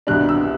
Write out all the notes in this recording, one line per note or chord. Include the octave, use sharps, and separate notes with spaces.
C2 B2 G3 D4 F#6
E6